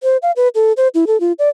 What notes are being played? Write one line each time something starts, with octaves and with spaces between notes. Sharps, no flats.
C5
F5
B4
A4
C5
E4
A4
F4
D5